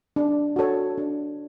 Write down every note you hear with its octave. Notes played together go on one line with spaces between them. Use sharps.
D4
F#4 A4 C#5
D4